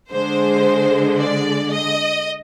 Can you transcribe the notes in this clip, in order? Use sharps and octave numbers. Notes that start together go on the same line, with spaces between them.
D3 G#3 C5
D5
D#5